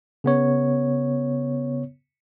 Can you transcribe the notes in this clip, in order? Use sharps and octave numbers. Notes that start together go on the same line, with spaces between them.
C#3 B3 C#5